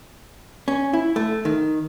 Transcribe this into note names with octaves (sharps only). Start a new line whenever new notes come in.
C#4
E4
A3
D#3